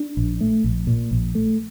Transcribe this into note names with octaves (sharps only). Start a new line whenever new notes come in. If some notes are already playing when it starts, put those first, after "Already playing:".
Already playing: D4
A#1
A3
A#1
A#2
A#1
A3